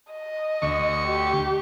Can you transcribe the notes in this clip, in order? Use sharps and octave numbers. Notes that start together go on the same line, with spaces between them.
D#5
D2 C#6
G4